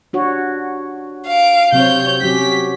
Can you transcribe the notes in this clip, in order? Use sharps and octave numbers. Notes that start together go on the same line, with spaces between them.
D4 F#4 C#5
F5 D7
C3 F#3 C4 C#5 G6
F#3 C#4 G4 B6